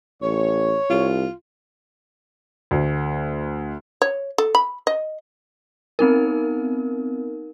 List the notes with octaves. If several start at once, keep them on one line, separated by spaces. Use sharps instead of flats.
A1 C#5
C2 F4
D2
C#5
A4
B5
D#5
B3 C4 D#4 A#4